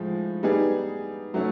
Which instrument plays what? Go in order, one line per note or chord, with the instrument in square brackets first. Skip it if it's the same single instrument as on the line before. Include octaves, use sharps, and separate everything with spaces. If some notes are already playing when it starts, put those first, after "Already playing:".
Already playing: [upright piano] A2 F3 G#3
G3 B3 D#4 G#4
F#3 A3 C#4